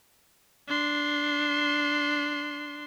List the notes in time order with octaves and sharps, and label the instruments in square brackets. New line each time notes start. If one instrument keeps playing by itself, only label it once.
[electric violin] D4 C6